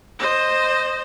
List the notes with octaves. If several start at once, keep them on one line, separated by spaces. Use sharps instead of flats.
C5 D#5